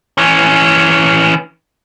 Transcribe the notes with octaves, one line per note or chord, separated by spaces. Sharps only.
E3 C#4